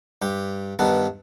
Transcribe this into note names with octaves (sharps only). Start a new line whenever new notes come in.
G2 G4
G2 D#3 B3 A4